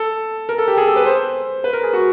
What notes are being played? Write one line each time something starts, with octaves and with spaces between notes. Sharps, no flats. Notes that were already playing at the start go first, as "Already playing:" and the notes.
Already playing: A4
A#4
A4
G4
G#4
A4
B4
C5
B4
A#4
G#4
F#4